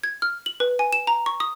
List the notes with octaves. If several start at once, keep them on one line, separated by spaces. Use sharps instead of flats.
G#6
F6
F#7
B4
G#5
E7
A#5
C#6
D#6